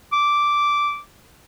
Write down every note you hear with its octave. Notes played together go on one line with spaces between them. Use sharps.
D6